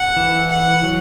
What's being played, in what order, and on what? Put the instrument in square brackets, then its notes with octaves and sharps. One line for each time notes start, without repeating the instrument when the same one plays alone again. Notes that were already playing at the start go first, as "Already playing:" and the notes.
Already playing: [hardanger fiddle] F#5
[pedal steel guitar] E3
[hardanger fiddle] F#5
[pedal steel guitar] F#3